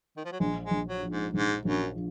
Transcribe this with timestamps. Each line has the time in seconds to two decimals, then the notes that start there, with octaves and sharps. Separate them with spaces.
0.17 D#3
0.25 F3
0.32 F#3
0.40 A#1 G#3
0.64 G#3
0.71 A#1
0.87 F#3
1.03 F3
1.10 G#2
1.34 A#1 G#2
1.65 A#1 F#2
1.95 F3